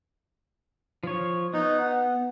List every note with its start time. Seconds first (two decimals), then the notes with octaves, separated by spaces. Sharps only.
1.03 F3 C#5
1.54 B3 D#4
1.80 F#5